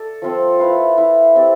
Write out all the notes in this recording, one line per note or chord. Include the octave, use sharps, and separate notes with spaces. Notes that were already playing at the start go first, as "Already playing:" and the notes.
Already playing: A4 D5
F3 C4 F4 A4
E4 B4 F5
E4 B4 F5
C4 G4 D5